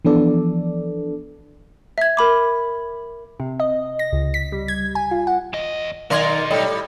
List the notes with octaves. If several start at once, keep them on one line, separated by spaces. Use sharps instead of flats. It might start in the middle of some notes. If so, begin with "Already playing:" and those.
E3 F3 B3 D4 A4 D5
E5 G#6
A#4 B5 D6
C3
D#5
A#6
C#2
B6
G3
G#6
G#5
F4
F#5
E2 D#5
B1 D#3 D#4 A#4 D5 F5 C6 G#6
A2 G3 A4 D#5